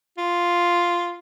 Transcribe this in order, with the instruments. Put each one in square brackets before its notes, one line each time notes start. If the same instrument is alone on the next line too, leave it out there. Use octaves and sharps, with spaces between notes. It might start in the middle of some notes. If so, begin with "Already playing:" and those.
[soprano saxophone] F4